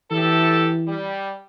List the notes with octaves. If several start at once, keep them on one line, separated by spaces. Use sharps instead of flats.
A2 E3 G4 A4
G3